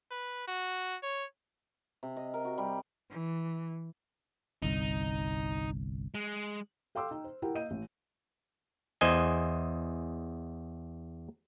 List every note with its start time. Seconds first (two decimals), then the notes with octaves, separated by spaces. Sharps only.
0.11 B4
0.48 F#4
1.03 C#5
2.03 C3
2.16 D#5
2.34 A#4
2.45 F#4
2.58 G3
3.11 E3
4.62 G1 C2 D#4
6.15 G#3
6.95 A4 F5 G5 C6 D6 E6
7.11 D#4 G5
7.24 C5
7.42 E4 G4 A#4 F#5 G5
7.55 A#3 D#5 G6 D#7
7.71 A1
9.01 E2 C5 D#5 G#5